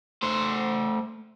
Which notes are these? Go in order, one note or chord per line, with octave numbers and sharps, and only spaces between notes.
A3 C5